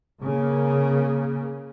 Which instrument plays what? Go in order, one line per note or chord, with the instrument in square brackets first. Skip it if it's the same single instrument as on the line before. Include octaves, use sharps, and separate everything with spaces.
[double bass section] C#3 A#3